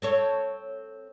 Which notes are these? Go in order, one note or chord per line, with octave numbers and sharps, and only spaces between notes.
C4 A4 C#5